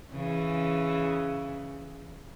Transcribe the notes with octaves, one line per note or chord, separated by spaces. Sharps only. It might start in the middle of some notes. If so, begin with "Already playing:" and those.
C#3 E3